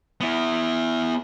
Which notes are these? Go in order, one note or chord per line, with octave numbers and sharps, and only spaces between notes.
B3 E4